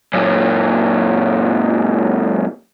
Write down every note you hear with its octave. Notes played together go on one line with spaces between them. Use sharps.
F#2 A#2